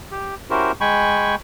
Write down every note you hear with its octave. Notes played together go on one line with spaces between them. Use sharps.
G4
C#4 E4 F#4 G4 A#4 C5
G#3 G5 G#5 B5 C#6